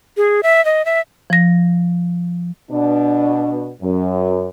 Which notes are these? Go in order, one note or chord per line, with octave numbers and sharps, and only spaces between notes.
G#4
E5
D#5
E5
F3 A#6
B2 D4
F#2